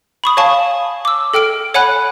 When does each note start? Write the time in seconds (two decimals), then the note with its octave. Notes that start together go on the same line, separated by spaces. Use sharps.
0.24 B5 C#6 D#6
0.37 C#5 F5 G#5 A5 C#6
1.05 D6 E6
1.34 A4 G5 F6 D7
1.74 C#5 F#5 G#5 B5 F#6